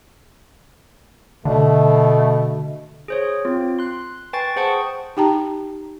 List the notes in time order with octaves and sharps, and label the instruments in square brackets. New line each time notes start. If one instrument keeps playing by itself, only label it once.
[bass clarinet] B2 [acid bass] D3 [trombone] A3
[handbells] G#4 C5 C#5
C4 F4
C6 F#6
B4 G5 G#5 C#6 A6
G#4 C5 F#5 G5 A5 C#6
[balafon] D#4 G4 G5 A5 A#5